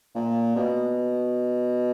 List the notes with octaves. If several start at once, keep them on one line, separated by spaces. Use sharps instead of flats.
A#2
B2